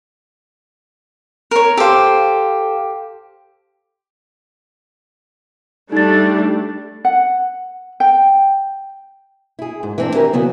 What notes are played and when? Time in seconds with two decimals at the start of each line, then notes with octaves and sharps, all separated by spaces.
1.51 A#4 C#5
1.77 G4 A4 C5 F5
5.92 G3 A3 D4 D#4 A6
7.05 F#5
8.00 G5
9.59 E4 G#4
9.83 G#2
9.98 E3 C4 D4
10.14 D#3 E4 G4 A#4 G#5
10.33 C#3 E3 F#3 B3